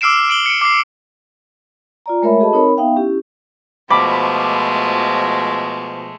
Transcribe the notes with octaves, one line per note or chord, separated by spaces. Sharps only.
D6 E6 F6 C7 D7 E7
D7 F#7 G7
C#7 D7
D6 C7
F4 D5 A#5
G#3 A3 A#4 C#5 E5 B5
F#4 G#4 A4 D#5 A5 B5
C4 D#4 A#4 C#5 B5
B3 D#4 E5 F5 G5
C#4 E4 G4
B2 F3 G#3 A3 B5 D6